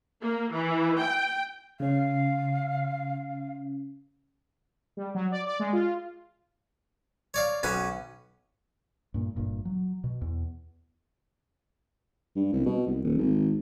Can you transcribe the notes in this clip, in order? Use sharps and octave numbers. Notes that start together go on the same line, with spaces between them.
A#3
E3
G5
C#3 C#4 F5
G3
F#3
D5
D5
G#3
F4
C#5 D5 F5
B1 C#4 F#4 B4
G2 A#2
G1 G2 A#2
F#3
B2
E2
G2
C2
B2
C2
D#1
G#1